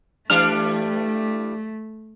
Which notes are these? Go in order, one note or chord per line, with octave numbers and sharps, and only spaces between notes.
E3 G3 A3 D4 F6